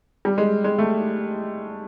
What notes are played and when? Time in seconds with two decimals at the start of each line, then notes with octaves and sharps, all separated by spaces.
0.25 G3
0.38 G#3
0.64 G#3
0.78 A3